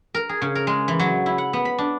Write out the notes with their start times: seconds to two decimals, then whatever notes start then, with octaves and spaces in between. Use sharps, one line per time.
0.14 A#4
0.29 G#4
0.42 C#3
0.55 A#4
0.67 G#3
0.88 E3
0.99 F#3
1.26 E4
1.38 F#5
1.53 B3
1.65 B5
1.78 D4